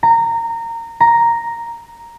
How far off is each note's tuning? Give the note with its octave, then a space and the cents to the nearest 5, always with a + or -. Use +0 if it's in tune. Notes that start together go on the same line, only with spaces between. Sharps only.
A#5 -20
A#5 +0